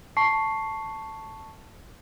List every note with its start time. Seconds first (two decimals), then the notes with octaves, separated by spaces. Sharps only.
0.17 A5 C#6 C7